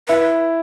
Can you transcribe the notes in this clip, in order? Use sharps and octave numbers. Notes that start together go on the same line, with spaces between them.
E4 B4